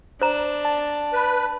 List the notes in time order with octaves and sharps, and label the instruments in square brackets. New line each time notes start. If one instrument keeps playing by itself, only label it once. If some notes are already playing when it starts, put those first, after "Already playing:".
[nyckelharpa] D4 [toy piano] C5 A#5
[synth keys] A5
[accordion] B4